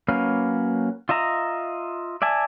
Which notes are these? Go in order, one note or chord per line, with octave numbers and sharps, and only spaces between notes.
F#3 A#3 C#4 B4 F5
F4 D#5 E5 A#5
D5 E5 G#5 A5